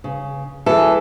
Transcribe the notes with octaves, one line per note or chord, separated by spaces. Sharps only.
C#3
E3 G#4 A4